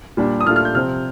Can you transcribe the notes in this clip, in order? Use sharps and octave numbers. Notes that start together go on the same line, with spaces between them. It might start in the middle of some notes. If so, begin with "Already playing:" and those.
A#2 G3 D4
D#6
A#2 A3 D4 F4 F6
F6
G6
C3 F3 C4 F6